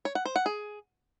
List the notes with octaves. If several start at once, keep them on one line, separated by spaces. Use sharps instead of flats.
C#5
F#5
C5
F#5
G#4